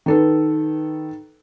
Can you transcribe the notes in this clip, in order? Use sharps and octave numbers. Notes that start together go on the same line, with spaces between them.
D#3 A4 B4